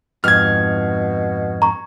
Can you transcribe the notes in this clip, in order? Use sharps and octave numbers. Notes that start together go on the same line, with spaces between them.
F2 G#2 B2 F6 G#6
A#5 C#6